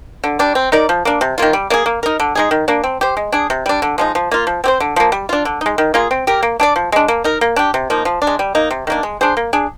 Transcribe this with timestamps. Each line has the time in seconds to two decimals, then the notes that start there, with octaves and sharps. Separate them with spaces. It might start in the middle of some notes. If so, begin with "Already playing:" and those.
0.24 D3
0.39 G3 D4
0.55 C4
0.72 D#4 A#4 D5
0.89 F3
1.05 A#3 D4
1.21 C3
1.38 D#3 A#3 F4
1.53 G3
1.70 A#3 D4 G#4
1.86 A#3
2.03 D#4 A#4
2.20 D3
2.35 G#3 D#4 G#4
2.51 D#3
2.68 A#3 D4
2.84 C4
3.01 G4 C5
3.17 G#3
3.32 D4 G#4
3.50 C3
3.66 G3 D4
3.82 D3
3.98 F3 G#3 D#4
4.15 F3
4.32 A#3 F4
4.47 F3
4.64 C4 G4 C5
4.80 D3
4.96 F3 A#3
5.12 G3
5.29 D4 F4
5.45 D3
5.61 G#3 D#4
5.78 D#3
5.94 A#3 F4 G#4
6.11 C4
6.27 G4 A#4
6.43 A#3
6.60 D4 G#4 D5
6.76 F3
6.92 G#3 D4
7.08 A#3
7.24 D#4 A#4
7.41 A#3
7.56 D4 G4
7.74 C3
7.90 F3 A#3 D#4
8.05 F3
8.22 D4
8.27 G#3
8.39 G3
8.55 A#3 D#4
8.71 C3
8.87 D#3 A#3 D4
9.03 G#3
9.21 D4 G#4 C5
9.37 A#3
9.53 D4 G#4